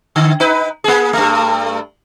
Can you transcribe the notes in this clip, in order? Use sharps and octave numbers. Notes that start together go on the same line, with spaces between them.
D3
D#4 B4
A#3 G#4
G2 A3